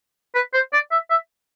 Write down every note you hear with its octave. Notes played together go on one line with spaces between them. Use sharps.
B4
C5
D5
E5
E5